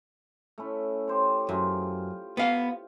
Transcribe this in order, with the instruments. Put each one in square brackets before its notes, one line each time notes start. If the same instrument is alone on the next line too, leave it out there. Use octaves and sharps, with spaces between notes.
[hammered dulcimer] A3 C#4 E4
G4 C5 C#5
[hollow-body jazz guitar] F#2 [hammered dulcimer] F4
[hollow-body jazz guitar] B3 F5